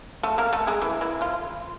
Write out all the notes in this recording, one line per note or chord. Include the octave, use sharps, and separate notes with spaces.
A3 A4
A#3 A#4
A3 A4
G#3 G#4
E3 E4
E3 E4
F3 F4